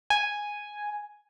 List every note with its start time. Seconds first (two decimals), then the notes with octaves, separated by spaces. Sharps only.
0.10 G#5